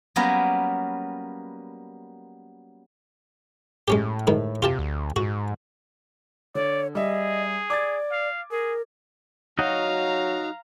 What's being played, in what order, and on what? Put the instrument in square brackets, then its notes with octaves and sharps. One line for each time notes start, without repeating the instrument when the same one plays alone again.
[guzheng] F#3 G3 A#3 B3 C#4 A#4
[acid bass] A2 [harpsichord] G#3 C#4 G4
[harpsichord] G#2 D#3
[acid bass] C3 [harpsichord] F4 G4 A5
[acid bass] D2
[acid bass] G#2 [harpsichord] F#4
[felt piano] D3 [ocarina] C#5 [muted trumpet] D5
[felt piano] G3 E5 [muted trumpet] G#4 [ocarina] D#5
[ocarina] D5 [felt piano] D6 G#6 A6
[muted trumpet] F5
[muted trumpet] G#4 [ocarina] A#4
[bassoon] F#3 [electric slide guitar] D#4 F#4 D#5 [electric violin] F5 A#5